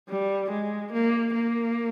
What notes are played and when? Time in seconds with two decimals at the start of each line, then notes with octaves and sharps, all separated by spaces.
0.09 G3
0.51 G#3
0.92 A#3
1.34 A#3